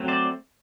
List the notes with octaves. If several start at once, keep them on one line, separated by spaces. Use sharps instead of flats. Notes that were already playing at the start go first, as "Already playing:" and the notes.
Already playing: F#3 A3 C4
C5 D5